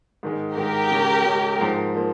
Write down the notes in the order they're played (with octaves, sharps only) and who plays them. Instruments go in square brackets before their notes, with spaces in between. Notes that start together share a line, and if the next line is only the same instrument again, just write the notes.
[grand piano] G#2 D#3 G#3
[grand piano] G#2 D#3 G#3 [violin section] G4 A#4
[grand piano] C#3 G#3 C#4
C#3 G#3 C#4
G#2 F3 A#3
F3 A#3